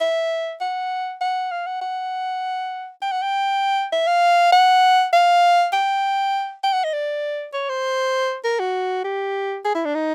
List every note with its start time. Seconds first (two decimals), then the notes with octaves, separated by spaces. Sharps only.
0.01 E5
0.61 F#5
1.21 F#5
1.51 F5
1.66 F#5
1.81 F#5
3.02 G5
3.12 F#5
3.22 G5
3.92 E5
4.07 F5
4.52 F#5
5.13 F5
5.73 G5
6.63 G5
6.73 F#5
6.84 D#5
6.93 D5
7.53 C#5
7.69 C5
8.44 A#4
8.59 F#4
9.04 G4
9.65 G#4
9.75 E4
9.85 D4
9.95 D#4